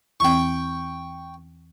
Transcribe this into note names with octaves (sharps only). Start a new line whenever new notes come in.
E2 E3 C4 G5 C#6